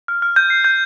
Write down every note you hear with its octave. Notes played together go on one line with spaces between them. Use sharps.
F6
F6
G6
C7
G6